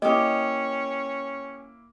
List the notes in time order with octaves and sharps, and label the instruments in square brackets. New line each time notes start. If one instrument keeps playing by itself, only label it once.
[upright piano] A#3 E4 [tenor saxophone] C#4 [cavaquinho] G4 D6 D#6 [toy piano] D#5